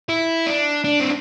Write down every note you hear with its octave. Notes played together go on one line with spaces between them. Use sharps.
E4
D4
D4
C4